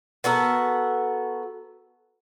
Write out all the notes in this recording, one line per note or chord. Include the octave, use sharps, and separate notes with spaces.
B3 F#4 A4 A#4